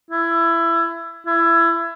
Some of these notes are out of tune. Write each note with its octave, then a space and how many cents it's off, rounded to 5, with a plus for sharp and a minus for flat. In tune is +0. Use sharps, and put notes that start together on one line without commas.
E4 +20
E4 +25